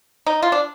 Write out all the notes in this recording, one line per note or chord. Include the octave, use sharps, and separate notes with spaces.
D#4
F4
D4